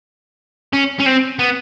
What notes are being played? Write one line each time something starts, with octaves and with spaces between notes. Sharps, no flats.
C#4
C#4
C4
B3